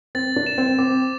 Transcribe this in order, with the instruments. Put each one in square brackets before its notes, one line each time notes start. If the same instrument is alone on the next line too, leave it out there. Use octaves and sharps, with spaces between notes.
[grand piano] C4 [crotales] A6
[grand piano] D4
[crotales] E7
[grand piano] C4
[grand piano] C4 [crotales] D6